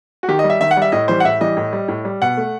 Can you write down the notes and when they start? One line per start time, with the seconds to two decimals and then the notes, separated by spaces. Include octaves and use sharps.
0.23 F#4
0.28 D#3 G4
0.39 D#5
0.44 G3
0.50 E5
0.61 D#3 E5
0.71 F#5
0.77 G3
0.82 E5
0.92 A2 D#5
1.08 E3 G3 C5
1.20 F#5
1.24 A2 E5
1.41 E3 G3 D#5
1.57 A2
1.73 G3
1.88 A2
2.05 G3
2.22 B2 F#5
2.37 A3